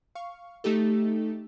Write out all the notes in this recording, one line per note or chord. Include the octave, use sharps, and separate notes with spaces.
F5 C#6
A3 D#4 G4 A4